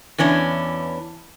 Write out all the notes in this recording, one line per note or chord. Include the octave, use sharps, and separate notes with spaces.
E2 E3 C#4 D4